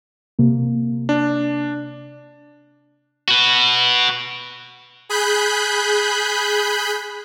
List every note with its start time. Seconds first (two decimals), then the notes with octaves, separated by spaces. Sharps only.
0.39 C3 A#3
1.09 D4
3.28 F#4 B4
5.09 G#4 B5 F#6 G6